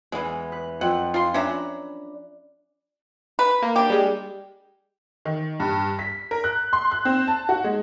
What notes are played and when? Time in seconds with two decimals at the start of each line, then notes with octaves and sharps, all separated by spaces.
0.12 E2 E3 G#3
0.52 B4 F#6
0.81 F2 F#5
1.14 F4 C6
1.34 C#4 D4 E5 A#5 B5 F#6
3.39 B4
3.62 A#3
3.76 D4 G4
3.90 G3 G#3
5.25 D#3
5.60 G2
5.99 B6
6.31 A#4
6.44 F#6
6.73 C6
6.91 F#6
7.05 C4
7.28 A5
7.49 F#4
7.64 G#3